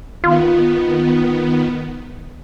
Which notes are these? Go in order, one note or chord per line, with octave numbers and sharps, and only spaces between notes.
D#3 B3 F4